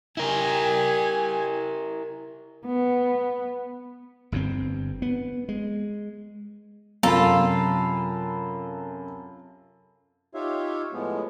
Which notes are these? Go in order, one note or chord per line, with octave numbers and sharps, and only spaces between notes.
E4 G4 A#4 G#5
B3
G1 G2 C3 C4
B3
G#3
F#2 C3 F4 A4 A#5 B5
D#4 F4 G4 C#5 E5 F5
A2 F3 G#3 B3